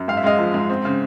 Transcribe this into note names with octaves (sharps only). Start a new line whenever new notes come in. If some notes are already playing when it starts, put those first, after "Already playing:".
Already playing: F#2
G#2 F5
E5
G#3 D#5 F5
F3
G#2
C4
C#3